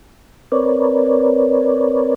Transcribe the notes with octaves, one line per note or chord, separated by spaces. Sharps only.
C4 A#4 B4 C#5 D5